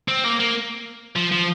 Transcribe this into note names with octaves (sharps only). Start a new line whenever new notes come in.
C4
A#3
A#3
F3
F3